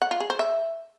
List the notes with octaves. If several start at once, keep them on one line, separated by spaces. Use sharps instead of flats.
F#5
F4
G#4
C5
E5